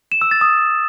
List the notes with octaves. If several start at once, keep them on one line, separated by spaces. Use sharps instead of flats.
E7
E6
A6
D#6